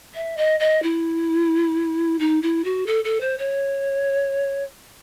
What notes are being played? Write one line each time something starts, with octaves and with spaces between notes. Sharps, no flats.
E5
D#5
D#5
E4
D#4
E4
F#4
A4
A4
C5
C#5